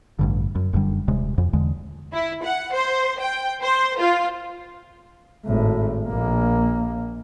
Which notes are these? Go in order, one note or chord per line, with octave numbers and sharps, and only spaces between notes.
A1 G2 D3
F#2
F1 F#2 D3 G3
D#1 C3 G#3
F2
E2 D3 G#3
E4
F#5
C5
G5
C5
F4
G#1 A2
A#1 A#3